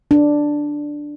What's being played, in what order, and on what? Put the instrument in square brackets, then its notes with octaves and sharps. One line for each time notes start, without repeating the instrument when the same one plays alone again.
[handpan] D4